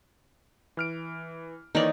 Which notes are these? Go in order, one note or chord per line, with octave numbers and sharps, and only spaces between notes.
E3 F6 D7
D#3 E3 A#3 D#4 C#5 D5